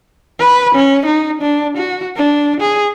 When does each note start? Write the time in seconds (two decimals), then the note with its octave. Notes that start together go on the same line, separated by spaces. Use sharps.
0.40 B4
0.75 C#4
1.06 D#4
1.42 D4
1.77 F#4
2.17 D4
2.61 G#4